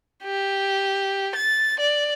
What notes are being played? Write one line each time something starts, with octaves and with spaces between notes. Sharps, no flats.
G4
A6
D5